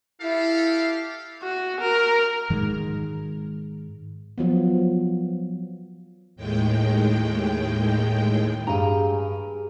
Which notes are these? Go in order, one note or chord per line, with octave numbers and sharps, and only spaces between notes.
E4 G4 A4 F5
F#4
A#4
G#2 D#3 G#3
F3 F#3 B3
D#2 A2 G#3 G5
G2 G4 G#4 F5 A#5